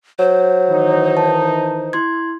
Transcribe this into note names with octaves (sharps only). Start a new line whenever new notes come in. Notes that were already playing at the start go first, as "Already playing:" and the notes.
F#3 C5 C#5
D#3 E3 D#4
A5
E4 C6 G#6